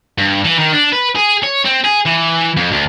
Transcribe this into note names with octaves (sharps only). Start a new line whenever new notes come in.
G2
E3
D#3
D4
B4
G#4
C#5
C4
G#4
E3
F2
D2